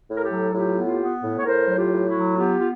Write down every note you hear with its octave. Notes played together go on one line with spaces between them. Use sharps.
A2
A#4
G4 A4
F#3
A2 F4 G4
B3
F4 G4
B3
A2
C#5
A2 A#4 C5
F#3
F4 G4
A2
E4 F#4
F#3
B3 F4 G4
F4